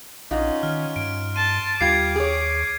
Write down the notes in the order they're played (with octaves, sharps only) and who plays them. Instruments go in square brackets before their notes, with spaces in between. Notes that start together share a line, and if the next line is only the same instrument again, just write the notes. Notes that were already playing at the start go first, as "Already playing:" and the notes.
[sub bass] A#1 [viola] C#4 [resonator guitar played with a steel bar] D#4 F4 F#4
[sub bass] D#3 [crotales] F6
[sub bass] G2 [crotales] D7
[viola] A5 C6 [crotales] D#7
[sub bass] D#2 [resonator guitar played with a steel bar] G3 F4 [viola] D6 [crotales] G#6 C7
[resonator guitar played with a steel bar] G#4 C#5